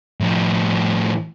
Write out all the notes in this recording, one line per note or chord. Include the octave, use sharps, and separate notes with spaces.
A2 F3